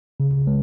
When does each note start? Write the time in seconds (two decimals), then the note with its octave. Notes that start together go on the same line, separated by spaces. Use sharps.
0.20 C#3
0.47 G#3